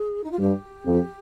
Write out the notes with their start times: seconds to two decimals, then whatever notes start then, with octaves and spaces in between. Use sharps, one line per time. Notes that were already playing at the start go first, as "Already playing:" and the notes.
Already playing: G#4
0.23 D#4
0.31 F4
0.38 G2 G4
0.85 F2